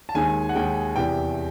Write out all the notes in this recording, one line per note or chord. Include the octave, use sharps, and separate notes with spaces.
A5
D#2 D#3 G#3 G#5
F#5
D#2 D#3 G#3 G5
E2 C3 E3 G5